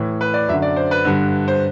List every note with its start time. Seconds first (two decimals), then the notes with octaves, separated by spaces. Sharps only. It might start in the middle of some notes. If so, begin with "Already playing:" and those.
Already playing: A2 E3
0.21 B4
0.34 D5
0.48 F#2 E5
0.52 D3
0.62 D5
0.76 C5
0.91 B4
1.05 G2 D3
1.48 C5